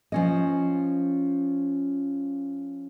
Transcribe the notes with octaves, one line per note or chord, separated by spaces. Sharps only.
F3 C#4 D#5